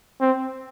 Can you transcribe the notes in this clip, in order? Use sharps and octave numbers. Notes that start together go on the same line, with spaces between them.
C4